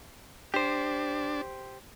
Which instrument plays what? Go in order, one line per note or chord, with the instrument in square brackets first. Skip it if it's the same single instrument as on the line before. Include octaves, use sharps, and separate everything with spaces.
[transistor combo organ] D4 [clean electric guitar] G4 C5